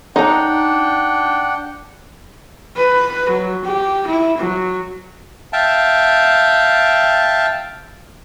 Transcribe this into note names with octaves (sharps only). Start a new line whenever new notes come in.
D4 D#4 F#5 G5 A#5
B4
F#3
G4
E4
F#3
E5 F5 G5 A5